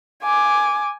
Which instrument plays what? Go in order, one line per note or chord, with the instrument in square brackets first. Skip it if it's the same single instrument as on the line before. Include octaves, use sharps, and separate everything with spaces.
[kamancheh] G#5 D6